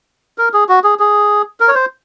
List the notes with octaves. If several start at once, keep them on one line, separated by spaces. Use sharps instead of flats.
A#4
G#4
F#4
G#4
G#4
A#4
C#5
C5